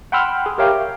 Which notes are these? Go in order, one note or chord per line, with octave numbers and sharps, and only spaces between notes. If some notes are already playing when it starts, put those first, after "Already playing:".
F#5 G5 B5 C6 E6 F6
G#4
G4 A#4 C#5 E5 F5 G5